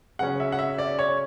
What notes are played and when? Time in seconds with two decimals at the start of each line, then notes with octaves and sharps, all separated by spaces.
0.19 C#3 F#3 C#4 F#5
0.40 E5
0.52 F#5
0.59 E5
0.78 D5
0.99 C#5